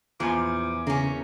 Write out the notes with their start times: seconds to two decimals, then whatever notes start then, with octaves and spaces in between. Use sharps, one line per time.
0.20 E2 A#2 F3 G#5 D6
0.87 C#3 A#3 C#4